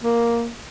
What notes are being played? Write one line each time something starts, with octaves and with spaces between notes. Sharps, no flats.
A#3